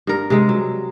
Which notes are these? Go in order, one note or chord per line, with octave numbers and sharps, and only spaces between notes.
G2 A#4
C3 G#3
F#3